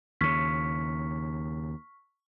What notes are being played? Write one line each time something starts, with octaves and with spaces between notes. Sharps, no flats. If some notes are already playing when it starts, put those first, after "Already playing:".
D#2 C#3 C#6 F6 B6